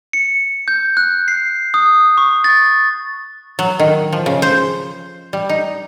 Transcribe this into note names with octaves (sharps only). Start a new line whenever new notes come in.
C#7
G6
F#6
C7
D#6
C#6
A6
F#3
D#3
F3
C#3
C5
G3
D#4